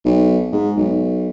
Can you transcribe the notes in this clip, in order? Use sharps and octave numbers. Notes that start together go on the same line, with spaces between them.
B1
G#2
B1